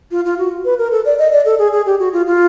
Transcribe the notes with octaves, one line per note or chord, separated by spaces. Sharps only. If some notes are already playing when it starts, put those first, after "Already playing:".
F4
F4
F#4
B4
A#4
A4
D5
D#5
D5
A4
G#4
G#4
G4
F#4
F4
F4